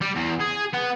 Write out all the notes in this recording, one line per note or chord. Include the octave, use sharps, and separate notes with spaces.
G3
E2
G#4
B3